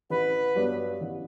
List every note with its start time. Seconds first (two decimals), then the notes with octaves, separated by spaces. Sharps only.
0.10 A1 B4
0.56 G2 F#3 B3 D4
1.01 A1